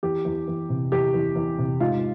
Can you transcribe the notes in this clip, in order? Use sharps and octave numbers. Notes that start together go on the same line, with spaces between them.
E2 G4
E2
E2
C3
E2 G4
E2
E2
C3
G#2 F4